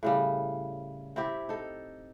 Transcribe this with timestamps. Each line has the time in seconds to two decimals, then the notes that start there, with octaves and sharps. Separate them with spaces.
0.03 A2 C#3 G3
1.16 C4 E4 G4
1.49 D#4 A4